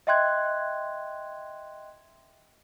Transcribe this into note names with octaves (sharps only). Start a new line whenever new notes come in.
D#5 E5 G5 C6 F#6 G#6